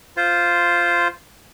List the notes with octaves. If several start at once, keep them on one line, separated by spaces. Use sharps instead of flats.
F4 C5